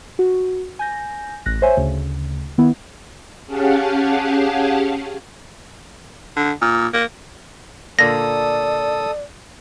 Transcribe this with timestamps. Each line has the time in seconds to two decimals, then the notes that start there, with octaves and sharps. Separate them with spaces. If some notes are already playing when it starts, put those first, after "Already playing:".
0.19 F#4
0.79 G#5 G6 A#6
1.46 A1 F#6 A#6
1.62 C5 C#5 E5 G#5
1.77 D2 C#3
2.58 D#3 B3 E4
3.47 C#4 G4 G#4 F5 F#5 A5
6.36 D3
6.62 A#2
6.94 A#3
7.99 A#2 D3 A#3 A4 D5 D#6 A#6